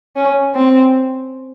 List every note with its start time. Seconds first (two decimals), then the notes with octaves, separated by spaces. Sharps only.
0.16 C#4
0.55 C4